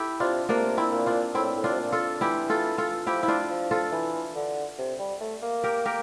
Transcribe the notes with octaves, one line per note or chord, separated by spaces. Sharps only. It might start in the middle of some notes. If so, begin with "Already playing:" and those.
Already playing: E4 G4 A4
C3 D4 F4
C3 A#3 D4
C4 E4
A#2
D4 F4
A2 C4 E4
A2
D4 F4
C3
A#2
F4 A4
E3 E4 G4
F4 A4
F4 A4
F3 E4 G4
E4
D4 F4
F3
F4 A4
E3
D3
C3
G3
A3
A#3
G4 A#4
G4 A#4